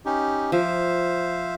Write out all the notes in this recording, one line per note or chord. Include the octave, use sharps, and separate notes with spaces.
C#4 D#4 G4
F3 C5 E5 F5